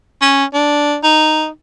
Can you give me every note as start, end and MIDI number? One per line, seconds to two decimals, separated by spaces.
0.22 0.44 61
0.54 0.97 62
1.03 1.48 63